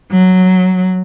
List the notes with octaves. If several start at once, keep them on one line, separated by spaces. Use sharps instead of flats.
F#3